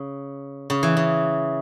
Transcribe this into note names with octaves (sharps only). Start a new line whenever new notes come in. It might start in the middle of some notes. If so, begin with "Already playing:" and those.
Already playing: C#3
C#3
E3
C#3